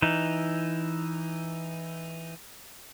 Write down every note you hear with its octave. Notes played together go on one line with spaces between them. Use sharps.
E3 D#4